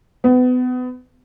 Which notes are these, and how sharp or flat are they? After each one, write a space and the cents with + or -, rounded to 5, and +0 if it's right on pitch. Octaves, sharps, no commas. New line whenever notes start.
B3 +30